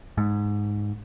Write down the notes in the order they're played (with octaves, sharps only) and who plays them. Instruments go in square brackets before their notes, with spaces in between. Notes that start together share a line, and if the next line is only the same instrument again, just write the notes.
[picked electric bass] G#2